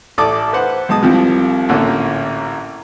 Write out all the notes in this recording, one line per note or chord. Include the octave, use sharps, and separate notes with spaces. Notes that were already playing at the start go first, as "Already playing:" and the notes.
A1 A4 D5 A5 D6 D#6
B4 C5 F#5
B1 G#3 A5 D#6
C2 C3 F3
A1 A#2 D3 A#3 C#4